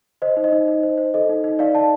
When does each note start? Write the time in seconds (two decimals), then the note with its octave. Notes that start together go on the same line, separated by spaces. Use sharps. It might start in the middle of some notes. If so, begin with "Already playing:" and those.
0.22 C5 D#5
0.37 D#4
0.44 D#5
0.52 D#4
0.68 D#4
0.83 C5
0.97 C5
1.14 A4 D#5
1.29 D#4
1.44 D#4
1.59 D#4 D5 F5
1.75 D5 F5 A5